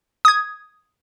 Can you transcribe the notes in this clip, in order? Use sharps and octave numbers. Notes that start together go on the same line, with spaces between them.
D#6 G#6